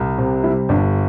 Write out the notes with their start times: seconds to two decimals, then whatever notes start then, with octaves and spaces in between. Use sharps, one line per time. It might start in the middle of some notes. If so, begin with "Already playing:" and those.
Already playing: C2
0.18 C3
0.44 G3 E4
0.69 G1 D4